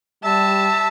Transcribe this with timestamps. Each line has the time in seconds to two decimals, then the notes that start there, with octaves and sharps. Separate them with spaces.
0.24 G3 E5 A5